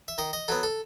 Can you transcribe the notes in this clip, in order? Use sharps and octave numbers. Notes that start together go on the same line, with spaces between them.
E5
D#3 D#5
D#5
F#3 B3 A4
A4